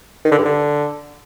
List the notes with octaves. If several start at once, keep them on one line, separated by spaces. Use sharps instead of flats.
D#3
D3
G2
D3